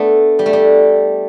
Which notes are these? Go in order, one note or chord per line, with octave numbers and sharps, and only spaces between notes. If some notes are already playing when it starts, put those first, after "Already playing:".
Already playing: A3 B3 D4
G3
A3
G3